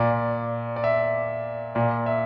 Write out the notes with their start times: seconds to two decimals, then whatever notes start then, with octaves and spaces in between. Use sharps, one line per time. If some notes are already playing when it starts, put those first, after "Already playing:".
Already playing: A#2 D5
0.76 D5
0.84 E5
1.75 A#2 D5
2.06 E5